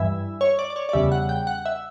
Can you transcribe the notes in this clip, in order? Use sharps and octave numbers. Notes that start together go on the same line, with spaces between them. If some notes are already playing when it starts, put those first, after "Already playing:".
Already playing: G2 E3 E5
C#5
D5
D5
C#5
D5
E2 C#3 G3 E5
F#5
G5
F#5
E5